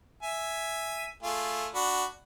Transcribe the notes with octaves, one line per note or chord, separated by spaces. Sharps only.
E5 G#5
A3 F4 G#4
D4 F#4 B5